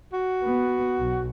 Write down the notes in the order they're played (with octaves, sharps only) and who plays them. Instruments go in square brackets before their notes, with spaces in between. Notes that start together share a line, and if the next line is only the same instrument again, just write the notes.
[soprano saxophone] F#4
[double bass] B3
B1